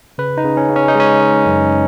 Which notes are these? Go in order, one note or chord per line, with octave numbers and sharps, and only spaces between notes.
C#3 B4
D#4
C#3
C#4
C#3
C#4
D#4
G#3 C#4
G#3
F#2